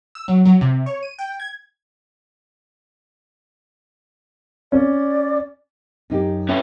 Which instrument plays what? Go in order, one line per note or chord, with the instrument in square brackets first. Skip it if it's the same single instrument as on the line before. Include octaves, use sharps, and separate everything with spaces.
[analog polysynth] E6
F#3
F#3
C3
C#5
D#7
G5
G#6
[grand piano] C#4 [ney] D5
[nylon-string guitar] F#2 D#4 G4
[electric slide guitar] C#4 E4 B4